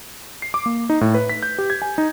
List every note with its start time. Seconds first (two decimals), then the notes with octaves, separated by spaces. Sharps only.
0.42 C7
0.54 D6
0.66 A#3
0.90 D#4
1.01 A2
1.14 B4
1.29 B6
1.43 G6
1.58 G4
1.70 G#6
1.82 G#5
1.98 D#4